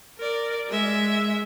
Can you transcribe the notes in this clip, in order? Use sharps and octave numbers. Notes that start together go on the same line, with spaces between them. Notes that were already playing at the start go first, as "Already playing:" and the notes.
A#4 D5
G#3 E5